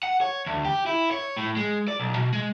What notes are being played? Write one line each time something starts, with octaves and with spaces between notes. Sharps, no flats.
F#5
C#5
D2
G4
E4
C#5
A2
G#3
D5
B1
B2
G#3